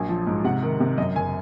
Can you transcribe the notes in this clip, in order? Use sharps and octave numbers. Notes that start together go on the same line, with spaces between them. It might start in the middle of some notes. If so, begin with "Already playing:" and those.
Already playing: A#1 F#3 G#5
F3
G#2
C3 F#5
D#3
C3
F#2 D#5
F#1 G#5